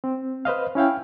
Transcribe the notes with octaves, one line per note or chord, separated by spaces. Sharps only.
C4
B4 C5 D#5 F5
C#4 E4 F5 G5